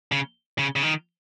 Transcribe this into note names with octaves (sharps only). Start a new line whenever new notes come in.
C#3
C#3
C#3
D#3